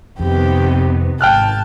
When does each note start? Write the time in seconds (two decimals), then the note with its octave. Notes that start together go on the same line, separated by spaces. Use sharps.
0.20 F2 C3 D#3 B3 G4
1.21 G#1 G5 A5 F6 F#6